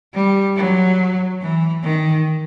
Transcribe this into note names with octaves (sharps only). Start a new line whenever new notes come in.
G3
F#3
E3
D#3